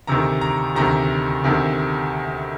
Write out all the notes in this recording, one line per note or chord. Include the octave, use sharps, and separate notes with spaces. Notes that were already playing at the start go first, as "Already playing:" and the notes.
D2 C3 D#3 A#5
A#5
D2 C3 D#3 A#5
D2 C3 D#3